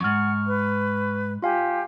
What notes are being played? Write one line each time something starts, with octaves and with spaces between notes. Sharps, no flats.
F2 G#2 F#5 C#6 F6
B4
F4 G4 F5 G#5